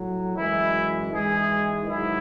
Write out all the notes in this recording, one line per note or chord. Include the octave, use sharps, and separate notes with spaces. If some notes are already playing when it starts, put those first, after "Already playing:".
Already playing: A2 F#3
F#2 E3 G#3 E4
G#2 E3 G#3 G#4
G#2 D#3 F#3 E4